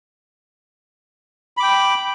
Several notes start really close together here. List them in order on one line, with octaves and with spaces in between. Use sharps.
B5 D6 G5